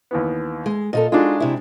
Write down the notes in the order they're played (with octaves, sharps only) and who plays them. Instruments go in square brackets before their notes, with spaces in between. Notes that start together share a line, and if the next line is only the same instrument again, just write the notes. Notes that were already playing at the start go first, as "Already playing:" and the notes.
[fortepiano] D#2 E3 B3
[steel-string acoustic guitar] G#3
[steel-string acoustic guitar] A#2 F4 A4 [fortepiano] D#5
[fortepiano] G#3 D4 F#4 [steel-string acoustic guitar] D#4 F4
[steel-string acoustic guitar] C3 E4